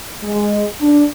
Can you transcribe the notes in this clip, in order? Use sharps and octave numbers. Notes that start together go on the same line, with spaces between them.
G#3
D4